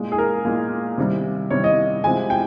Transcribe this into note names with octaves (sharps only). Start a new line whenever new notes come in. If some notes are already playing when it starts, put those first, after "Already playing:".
Already playing: A#2 G#3
G#4
A#4
A#2 G#3
C3 D#3 G3
C3 D#3 G3 C#5
D#5
C3 F3 G#3 G#5
G5